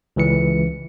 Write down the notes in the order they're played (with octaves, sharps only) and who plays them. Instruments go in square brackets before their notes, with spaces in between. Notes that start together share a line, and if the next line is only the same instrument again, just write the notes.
[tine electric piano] C#2 E3 C#7